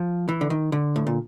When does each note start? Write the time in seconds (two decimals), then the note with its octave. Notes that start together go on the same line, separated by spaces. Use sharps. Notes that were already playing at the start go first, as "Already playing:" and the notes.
Already playing: F3
0.29 E3
0.41 D3
0.50 D#3
0.72 D3
0.96 A2
1.07 A#2